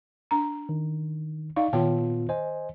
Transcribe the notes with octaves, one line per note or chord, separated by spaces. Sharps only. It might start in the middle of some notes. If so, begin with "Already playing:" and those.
D4 A#5
D#3
D#4 D5 F5 C#6
A#2 D#3 B3 F4 G5 A5
C5 D#5 G#5